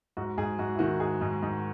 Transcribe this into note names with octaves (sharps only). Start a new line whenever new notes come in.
G#2 F#4
G#2 G#4
G#2 F#4
E4
D#3 F#4
G#2 G#4
G#2
G#2